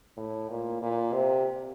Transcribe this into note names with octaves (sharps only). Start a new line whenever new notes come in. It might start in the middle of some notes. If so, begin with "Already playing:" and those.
A2
A#2
A#2
C3